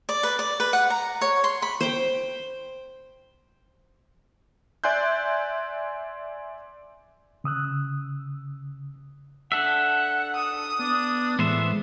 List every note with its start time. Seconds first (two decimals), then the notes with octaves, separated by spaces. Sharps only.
0.09 D5
0.23 B4
0.39 D5
0.60 B4
0.73 F#5
0.90 A#5
1.21 C#5
1.44 C6
1.62 B5
1.80 C5 G5
4.84 D5 E5 G#5 C6 F#6 G6
7.44 C#3 D#6 E6 F#6
9.52 D4 A4 E5 F#5
10.35 D#6
10.79 B3 D4
11.39 A2 E3 G#3 B3 C5 E5